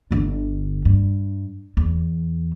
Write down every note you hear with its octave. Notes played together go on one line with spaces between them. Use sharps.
G1 D3
G2
E2